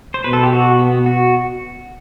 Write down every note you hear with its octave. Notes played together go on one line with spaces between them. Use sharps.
C5
B2 B4
A4
G4
F#4
B3
F#4